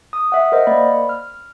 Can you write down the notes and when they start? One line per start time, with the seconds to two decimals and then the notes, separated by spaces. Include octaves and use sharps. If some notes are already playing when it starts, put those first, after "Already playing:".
0.13 D#6
0.32 E5 F#5
0.52 A#4 C5 D#5 F#5
0.67 A#3 D5 B5
1.09 F6